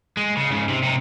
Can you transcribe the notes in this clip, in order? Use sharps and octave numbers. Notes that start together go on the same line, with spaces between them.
G#3
C#3
G#2 C#3
C3
C3 D#4